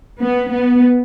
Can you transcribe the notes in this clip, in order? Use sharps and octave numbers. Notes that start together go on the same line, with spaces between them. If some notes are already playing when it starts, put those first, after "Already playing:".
B3
B3